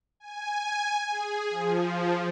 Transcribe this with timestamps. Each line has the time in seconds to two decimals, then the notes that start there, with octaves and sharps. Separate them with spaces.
0.20 G#5
1.10 G#4
1.50 F3